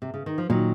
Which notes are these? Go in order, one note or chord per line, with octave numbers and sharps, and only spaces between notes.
C3
C#3
D#3
F3
A#2 D#3 F#3